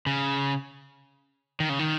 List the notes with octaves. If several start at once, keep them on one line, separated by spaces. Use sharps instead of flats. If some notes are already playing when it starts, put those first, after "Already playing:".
C#3
D#3
C#3
D#3